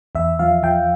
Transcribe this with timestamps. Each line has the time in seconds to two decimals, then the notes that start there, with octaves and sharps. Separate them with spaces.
0.15 E2 E5
0.39 F3 F5
0.63 F3 G5